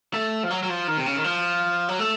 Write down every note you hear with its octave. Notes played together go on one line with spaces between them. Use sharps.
A3
F3
F#3
F#3
F3
D#3
C3
C#3
D#3
F3
F#3
A3